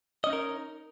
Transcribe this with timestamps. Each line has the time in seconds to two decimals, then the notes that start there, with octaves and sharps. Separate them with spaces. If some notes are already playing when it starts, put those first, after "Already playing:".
0.24 D#5
0.27 C#4
0.30 D#4
0.33 A#4